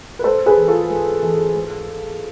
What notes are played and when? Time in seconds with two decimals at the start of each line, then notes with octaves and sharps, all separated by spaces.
0.19 B4
0.24 G#2 A4 C5
0.46 G#4 B4
0.57 E3
0.68 F4 A4
0.89 G#2
1.22 E3
1.55 G#2